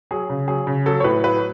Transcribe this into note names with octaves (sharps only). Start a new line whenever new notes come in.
F#3 G#4
C#3
F#3 G#4
C#3
F#3 A4
C#5
A2 B4
F#3 B4